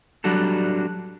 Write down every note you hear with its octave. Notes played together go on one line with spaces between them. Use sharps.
F#3 G3 D4 F#4 A4